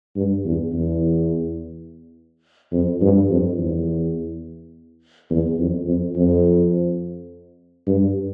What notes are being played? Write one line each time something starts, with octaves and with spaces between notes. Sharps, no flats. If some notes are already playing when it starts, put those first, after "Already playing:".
G2
E2
E2
F2
G2
F2
E2
E2
F2
F2
F2
G2